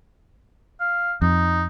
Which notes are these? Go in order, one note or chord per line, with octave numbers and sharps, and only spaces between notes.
F5
F2 D#4